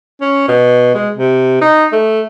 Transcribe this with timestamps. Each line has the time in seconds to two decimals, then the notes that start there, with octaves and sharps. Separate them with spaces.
0.21 C#4
0.48 B2
0.95 G#3
1.16 C3
1.61 D#4
1.93 A3